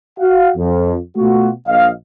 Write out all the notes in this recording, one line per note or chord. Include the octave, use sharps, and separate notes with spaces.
F#4 F5 F#5
F2
B2 A3 F4 F#4
A#1 D#5 F5